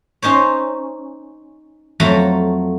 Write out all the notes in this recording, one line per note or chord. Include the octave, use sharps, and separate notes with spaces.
C#4 D#4 C5 C#5
F2 F#3 A3 A4 A#5